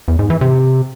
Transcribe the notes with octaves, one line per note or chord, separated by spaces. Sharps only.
E2
G#2
E3
C3